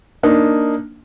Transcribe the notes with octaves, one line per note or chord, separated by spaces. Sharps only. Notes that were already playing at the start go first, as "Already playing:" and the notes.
A#3 D4 D#4